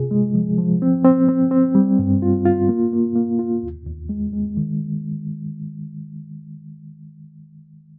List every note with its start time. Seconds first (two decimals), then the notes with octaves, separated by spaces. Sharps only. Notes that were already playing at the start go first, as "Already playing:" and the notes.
Already playing: C3 F4 G#4
0.11 G#3
0.34 F3
0.58 F3
0.82 C4
1.04 C4
1.29 C4
1.51 C4
1.75 G3
1.99 G2
2.22 F4
2.45 F4
2.69 A#3
2.93 A#3
3.16 A#3
3.39 F4
3.63 D#2
3.86 D#2
4.09 G#3
4.33 G#3
4.57 D#3